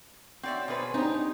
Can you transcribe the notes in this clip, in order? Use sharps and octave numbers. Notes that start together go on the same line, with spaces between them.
C4 F#4 C#5 D5 E5
B2 G#4 B4 C5 D5
C4 D4 D#4 G4